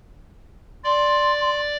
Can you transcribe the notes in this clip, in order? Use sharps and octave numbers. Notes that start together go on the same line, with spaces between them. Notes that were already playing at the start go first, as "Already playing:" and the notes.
D5 C6